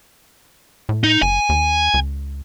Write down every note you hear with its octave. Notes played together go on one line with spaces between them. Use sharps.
A2
D#4
F#1 G#5
D#2
C#2